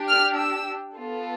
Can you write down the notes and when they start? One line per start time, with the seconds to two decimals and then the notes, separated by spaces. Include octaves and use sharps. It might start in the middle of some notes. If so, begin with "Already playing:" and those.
Already playing: D4 G4
0.09 F6
0.38 E6
0.95 B3 F4 A4